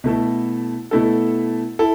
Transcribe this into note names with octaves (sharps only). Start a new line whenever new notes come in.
B2 A3 E4 A4
B2 A3 E4 A4
E4 A4